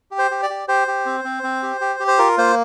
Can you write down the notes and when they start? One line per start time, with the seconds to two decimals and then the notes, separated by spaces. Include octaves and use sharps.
0.11 G4
0.19 C5
0.31 G4
0.43 D5
0.50 G4
0.68 G4 C5
0.88 G4
1.06 C4
1.24 C4
1.43 C4
1.63 G4
1.81 G4
2.00 G4
2.08 C5
2.19 F4 A#4
2.38 A#3 C5